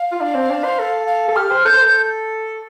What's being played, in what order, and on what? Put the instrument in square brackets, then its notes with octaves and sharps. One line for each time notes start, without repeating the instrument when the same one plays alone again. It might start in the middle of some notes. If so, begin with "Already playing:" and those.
Already playing: [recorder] F5
[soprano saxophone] F4
D4
C4
D4
C5
A4
[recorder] F5
[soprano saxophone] A4
[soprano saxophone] G4 [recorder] F6
[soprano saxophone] C5
[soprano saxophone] A4 [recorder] G6
[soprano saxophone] C5
A4